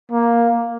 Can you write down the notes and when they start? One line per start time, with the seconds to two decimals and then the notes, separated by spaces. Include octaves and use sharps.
0.12 A#3